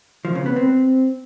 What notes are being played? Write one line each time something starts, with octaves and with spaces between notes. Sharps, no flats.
F3
C#3
B3
C4